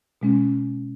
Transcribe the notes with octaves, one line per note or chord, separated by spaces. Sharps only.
B2 G#3 C#4